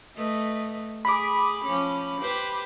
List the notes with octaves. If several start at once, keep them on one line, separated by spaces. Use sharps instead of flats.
A3 B4 D#5
G#4 B5 D6
F3 C#4
G4 B4 C5